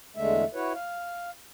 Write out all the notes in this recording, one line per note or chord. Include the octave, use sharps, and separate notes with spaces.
E2 D3 G#3 A3 E5
E4 F#4 B4 C#5
F5